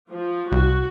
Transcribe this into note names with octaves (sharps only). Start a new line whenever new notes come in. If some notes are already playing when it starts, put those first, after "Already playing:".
F3
C2 F#4